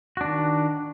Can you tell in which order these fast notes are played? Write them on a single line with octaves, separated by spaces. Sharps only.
F#4 D4 D#3